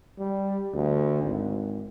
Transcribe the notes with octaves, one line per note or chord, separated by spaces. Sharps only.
G3
D2
G#1